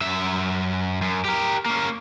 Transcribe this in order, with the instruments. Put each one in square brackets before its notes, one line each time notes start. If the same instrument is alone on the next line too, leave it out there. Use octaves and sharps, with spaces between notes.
[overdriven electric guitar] F#2 E5
F#2
G4 A#4
A#3 C#4